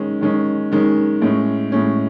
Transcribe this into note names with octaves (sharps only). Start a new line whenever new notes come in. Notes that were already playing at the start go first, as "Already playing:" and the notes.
Already playing: D#3 G#3 C#4
D#3 G#3 C#4
D#3 G#3 C#4
A2 G#3 C#4
A2 G#3 C#4